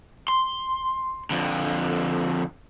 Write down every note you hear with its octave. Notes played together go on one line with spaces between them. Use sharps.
C6
F2 D3